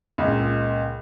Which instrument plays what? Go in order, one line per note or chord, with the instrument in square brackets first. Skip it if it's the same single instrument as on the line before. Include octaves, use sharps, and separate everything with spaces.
[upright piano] C#2 A#2 B5